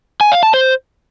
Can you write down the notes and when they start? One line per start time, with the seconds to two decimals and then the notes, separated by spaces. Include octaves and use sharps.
0.21 G#5
0.32 F5
0.43 A5
0.54 C5